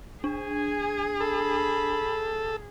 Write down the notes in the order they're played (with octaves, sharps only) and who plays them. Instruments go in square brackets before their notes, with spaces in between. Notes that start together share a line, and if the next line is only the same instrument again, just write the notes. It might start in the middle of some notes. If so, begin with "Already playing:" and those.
[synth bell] D4 [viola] G#4 [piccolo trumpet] G#5
[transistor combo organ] A4 [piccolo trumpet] B5